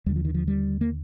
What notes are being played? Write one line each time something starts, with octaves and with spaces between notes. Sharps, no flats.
D#2 D3 G3
F3
D#3
F3
G3
A#3